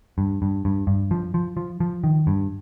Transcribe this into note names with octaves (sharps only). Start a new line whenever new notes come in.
G2
G2
G2
G2
F3
F3
F3
F3
D#3
G2